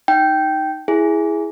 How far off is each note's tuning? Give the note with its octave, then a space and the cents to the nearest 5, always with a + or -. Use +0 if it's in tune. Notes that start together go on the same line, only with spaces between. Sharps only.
D#4 +0 G5 -10
E4 +0 G#4 +0